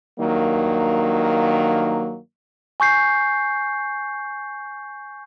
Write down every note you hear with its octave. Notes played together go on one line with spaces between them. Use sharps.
G2 D#3 F#3 A#3
G#5 C#6 G6 C7